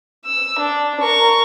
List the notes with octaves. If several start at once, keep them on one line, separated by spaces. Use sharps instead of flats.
E6
D4
A#4 C#6